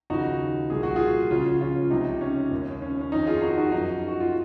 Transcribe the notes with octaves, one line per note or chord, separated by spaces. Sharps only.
D#2 C#3 F3 D#4 F#4
C2 A#2 F3 G#4
F#4
F4 G#4
C#2 C#3 F3 C#4 F4
C#4 F4
C#2 C3 F3 D#4
C#4
D#2 D#3
C#4
C#4
F2 D#3 D#4
F4 G#4
D#4 F#4
D#4 F#4
F#2 F3 D#4
F#4
F4